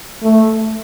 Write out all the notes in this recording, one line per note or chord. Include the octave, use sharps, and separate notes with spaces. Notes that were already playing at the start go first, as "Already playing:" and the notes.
A3